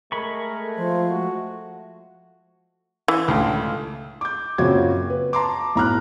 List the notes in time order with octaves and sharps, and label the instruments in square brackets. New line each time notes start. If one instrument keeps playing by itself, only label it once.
[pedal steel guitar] G#3 B5 C#6 [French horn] A3 [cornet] A#4
[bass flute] F3 [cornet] C5
[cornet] F#4
[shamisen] E3
[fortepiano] C#2 A2 D3
[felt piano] D6 G6
F#2 A#2 C#3 C4 F#4 G#6
B4
A5 A#5 C6 D6
B1 A2 A#5 B5 F6 F#6